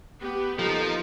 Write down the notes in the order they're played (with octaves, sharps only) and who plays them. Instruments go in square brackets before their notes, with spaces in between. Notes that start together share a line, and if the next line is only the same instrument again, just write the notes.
[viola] B3 G4
[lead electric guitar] F3 [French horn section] A#3 B3 A4 [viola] D#4